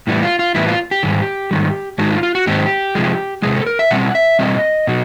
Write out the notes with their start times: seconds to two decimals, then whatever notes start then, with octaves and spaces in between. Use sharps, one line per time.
0.07 A2 E3 G3 B3
0.23 F4
0.39 F4
0.55 A2 E3 G3 B3 E4
0.67 F4
0.91 G4
1.03 G#2 D#3 G3
1.51 G#2 D#3 G3
1.98 G#2 D#3 G#3 D#4 F#4
2.10 F4
2.23 F4
2.35 F#4
2.47 G#2 D#3 G#3 C4 D#4 G4
2.95 C3 F3 G#3
3.42 C3 F3 G#3 G#4
3.54 A4
3.66 A#4
3.79 E5
3.91 B2 G3 C4 F#5
4.15 E5
4.39 B2 G3 C4 D#5
4.87 B2 F#3